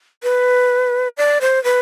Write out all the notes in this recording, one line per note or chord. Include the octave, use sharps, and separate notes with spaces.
B4
D5
C5
B4